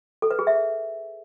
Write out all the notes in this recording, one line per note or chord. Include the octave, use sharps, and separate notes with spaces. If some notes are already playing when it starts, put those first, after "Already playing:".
A4
B4
G#4
E5